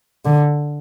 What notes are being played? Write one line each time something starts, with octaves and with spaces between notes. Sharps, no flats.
D3